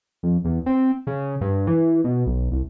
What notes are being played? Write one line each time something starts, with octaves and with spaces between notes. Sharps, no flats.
F2
E2
C4
C#3
G2
E3
B2
B1
C2